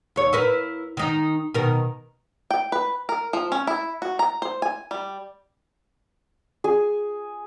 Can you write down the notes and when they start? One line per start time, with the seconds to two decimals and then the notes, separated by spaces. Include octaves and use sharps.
0.16 D#2 C#5
0.33 E4 A#4 B4
0.97 D#3 D#4
1.54 B2 D#3 A#4
2.51 G5
2.72 B4
3.09 A#4
3.33 F3
3.52 C#4
3.67 E4
4.02 F#4
4.19 A#5
4.42 C5
4.62 G#5
4.91 G3
6.64 G#4